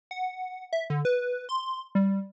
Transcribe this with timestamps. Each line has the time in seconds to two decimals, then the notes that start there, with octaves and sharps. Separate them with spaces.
0.11 F#5
0.73 E5
0.90 D3
1.05 B4
1.49 C6
1.95 G3